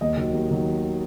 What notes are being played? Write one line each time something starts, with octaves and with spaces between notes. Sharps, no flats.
D#2 D#5
D#3 F#3
D#2
D#3 F#3